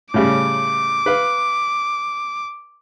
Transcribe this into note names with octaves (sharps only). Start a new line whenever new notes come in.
A2 C#3 G3 D6
B4 F5